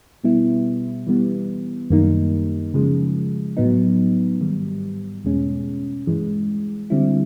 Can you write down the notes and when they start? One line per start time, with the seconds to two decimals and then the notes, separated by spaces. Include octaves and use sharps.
0.24 B2 G3 B3 E4
1.07 E3 G3 B3
1.90 F#2 D#3 G3 A#3 D#4
2.74 C#3 F3 G#3
3.57 A2 F#3 B3 D#4
4.41 G#2 D#3 G3
5.24 E2 B2 G#3 C#4
6.07 G2 E3 G#3
6.90 D3 G3 C4 E4